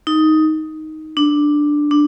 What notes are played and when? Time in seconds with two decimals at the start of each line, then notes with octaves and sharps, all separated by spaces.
0.07 D#4
1.17 D4
1.91 D4